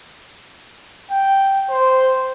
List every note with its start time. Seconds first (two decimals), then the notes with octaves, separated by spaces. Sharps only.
1.10 G5
1.70 C5